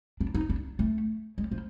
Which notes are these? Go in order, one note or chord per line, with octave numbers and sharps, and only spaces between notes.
D4
D#4
D4
A3
G#3
F3